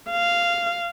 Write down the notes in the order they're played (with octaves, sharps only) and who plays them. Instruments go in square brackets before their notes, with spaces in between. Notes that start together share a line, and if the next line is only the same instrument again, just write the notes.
[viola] F5